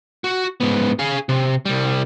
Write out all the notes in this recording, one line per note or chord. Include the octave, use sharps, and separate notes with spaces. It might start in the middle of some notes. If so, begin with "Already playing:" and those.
F#4
G#2 B3
G#4 F5
C3
C2 G3